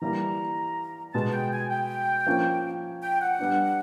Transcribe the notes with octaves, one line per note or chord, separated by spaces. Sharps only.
E3 G3 A#3 A#5
B2 G#3 B3 A5
G5
G#5
G5
F3 A#3 C#4
G5
F#5
G3 B3 D4